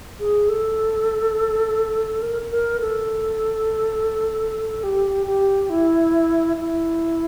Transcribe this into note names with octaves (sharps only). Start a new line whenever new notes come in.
G#4
A4
A#4
A#4
A4
G4
G4
E4
E4